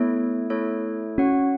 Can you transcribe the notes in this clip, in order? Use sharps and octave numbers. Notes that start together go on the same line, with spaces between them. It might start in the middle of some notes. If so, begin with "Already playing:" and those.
Already playing: A3 B3 E4 A4 C#5
A3 E4 A4 C#5
C#4 F#4 C#5 F#5